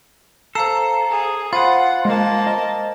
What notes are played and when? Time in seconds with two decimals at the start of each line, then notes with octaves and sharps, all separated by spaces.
0.55 A4 C5 F5 A#5 C7
1.10 G#4
1.53 F4 C5 F#5 B5
2.05 G#3 A#3 A5
2.47 D#5